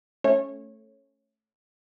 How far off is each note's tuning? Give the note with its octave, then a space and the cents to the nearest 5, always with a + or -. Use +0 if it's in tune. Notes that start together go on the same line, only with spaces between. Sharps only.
A3 +0 C#4 +0 C#5 -20